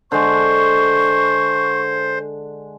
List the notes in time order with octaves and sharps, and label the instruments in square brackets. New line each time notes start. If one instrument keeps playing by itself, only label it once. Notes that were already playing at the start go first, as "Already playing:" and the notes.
[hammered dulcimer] D3 G#3 [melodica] C5 [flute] C#6